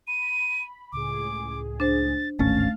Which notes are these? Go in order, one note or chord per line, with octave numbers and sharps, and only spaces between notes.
B5 D#7
C#2 A2 G#4 D6
D4 C5 A6
D1 G#1 A3 C#4 F5 A6